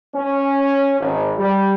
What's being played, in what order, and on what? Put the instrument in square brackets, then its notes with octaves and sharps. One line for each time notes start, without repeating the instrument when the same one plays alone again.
[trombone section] C#4
G#1
G3